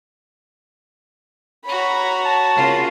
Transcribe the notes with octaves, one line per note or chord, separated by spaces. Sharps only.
F#4 C#5 A#5 B5
A5
C#3 A#3 F4